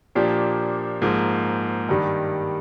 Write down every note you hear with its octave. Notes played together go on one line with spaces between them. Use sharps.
A#2 F3 A#3 D4 G4
G#2 F3 A#3
G2 D#3 G3